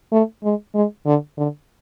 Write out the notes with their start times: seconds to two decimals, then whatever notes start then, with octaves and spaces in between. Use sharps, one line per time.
0.12 A3
0.44 G#3
0.75 G#3
1.06 D3
1.38 D3